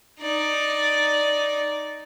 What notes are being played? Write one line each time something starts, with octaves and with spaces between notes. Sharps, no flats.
D#4 D5